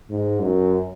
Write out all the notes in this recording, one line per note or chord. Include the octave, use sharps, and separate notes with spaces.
G#2
F#2